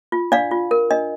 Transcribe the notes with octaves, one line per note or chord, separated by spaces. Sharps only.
F4
D4 D5 F5
F4
A#4
D4 D#5